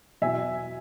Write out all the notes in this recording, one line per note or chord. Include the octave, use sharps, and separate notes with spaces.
E2 B2 F#3 E5 G#5